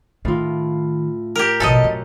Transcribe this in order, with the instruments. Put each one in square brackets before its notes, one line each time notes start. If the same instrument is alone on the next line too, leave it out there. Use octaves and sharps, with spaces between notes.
[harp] A2 F4 [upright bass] D#3
[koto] G4 A#4
[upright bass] A1 B2 [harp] F#2 [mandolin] A4 D5 D#5
[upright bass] F#3